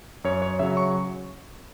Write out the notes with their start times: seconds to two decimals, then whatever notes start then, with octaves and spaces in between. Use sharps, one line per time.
0.24 F#2 C#5
0.42 C#5
0.59 C#3 F#3 E5
0.77 C#6